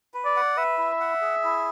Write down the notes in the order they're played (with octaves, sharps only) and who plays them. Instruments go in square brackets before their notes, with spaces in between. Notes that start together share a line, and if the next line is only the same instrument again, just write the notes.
[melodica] B4
[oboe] D5
[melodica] F#5
[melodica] B4 [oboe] E5
[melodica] E4
F#5
G#4
E4